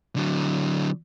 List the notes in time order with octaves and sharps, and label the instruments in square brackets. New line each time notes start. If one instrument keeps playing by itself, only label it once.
[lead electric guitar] D3 F#3